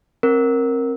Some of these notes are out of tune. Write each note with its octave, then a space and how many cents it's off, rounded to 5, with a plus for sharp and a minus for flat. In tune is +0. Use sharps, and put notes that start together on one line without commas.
C4 +30 A#4 +0